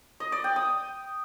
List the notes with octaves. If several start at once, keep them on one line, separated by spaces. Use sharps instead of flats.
D#5
D5
G5
D#6